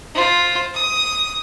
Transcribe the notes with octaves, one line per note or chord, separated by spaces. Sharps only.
F4 C5
D#6